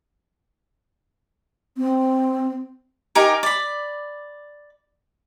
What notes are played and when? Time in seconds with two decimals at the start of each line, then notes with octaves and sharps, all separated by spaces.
1.77 C4
3.15 D#4 G4 A#4 G#5
3.43 D5 B5